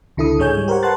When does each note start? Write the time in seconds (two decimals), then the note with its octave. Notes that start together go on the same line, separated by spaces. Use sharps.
0.17 C#2 D3 E4 A4 D#6
0.39 G#2 G#3 C#5 G#5 G6
0.54 G3 C#5
0.68 G4 A#4 C5 C#5 F#5
0.83 B4 F#5 A5 C6 F#6 A6